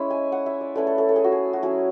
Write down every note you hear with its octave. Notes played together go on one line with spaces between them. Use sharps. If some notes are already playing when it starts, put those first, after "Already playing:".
Already playing: G#3 C#4 E4 B5 C#6
G#5
F#5
E5
D5
A3 C#4 E4 B4
A4
A4
A4
G#4
F#4
G#4
F#4
F#3 C#4 E4 G#4